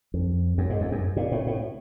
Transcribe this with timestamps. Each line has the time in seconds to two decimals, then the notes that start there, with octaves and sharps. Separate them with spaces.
0.14 F2
0.58 F#2
0.70 G#2
0.81 F2
0.92 F#2
1.17 A#2
1.32 A2
1.47 A2